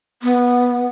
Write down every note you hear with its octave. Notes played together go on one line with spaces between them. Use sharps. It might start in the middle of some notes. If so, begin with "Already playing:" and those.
B3